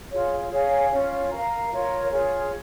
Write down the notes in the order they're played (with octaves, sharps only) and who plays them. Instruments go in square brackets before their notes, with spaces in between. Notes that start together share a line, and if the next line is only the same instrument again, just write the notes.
[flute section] F4 G#4 C#5
G#4 C#5 F5 G#5
C#4 F4 C#5
A#4 F5 A#5
F4 A#4 C#5
F4 G#4 C#5